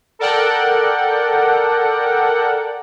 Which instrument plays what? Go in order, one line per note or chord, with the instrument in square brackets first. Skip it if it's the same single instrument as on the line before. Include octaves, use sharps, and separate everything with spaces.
[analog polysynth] A4 A#4 D5 F#5 G5